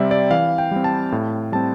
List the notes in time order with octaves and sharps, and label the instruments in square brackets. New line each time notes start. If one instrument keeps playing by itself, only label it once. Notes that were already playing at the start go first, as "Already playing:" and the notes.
Already playing: [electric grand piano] C3 G3 C4 D5 E5
D5
E3 F5
G5
G3 C4
A5
A2
G3 C4 A5